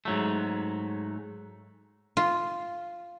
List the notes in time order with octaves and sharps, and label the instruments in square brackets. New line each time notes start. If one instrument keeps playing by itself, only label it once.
[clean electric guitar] G#2 F#3 A3
[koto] F4